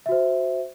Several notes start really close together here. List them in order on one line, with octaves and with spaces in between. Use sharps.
E5 F#4 C5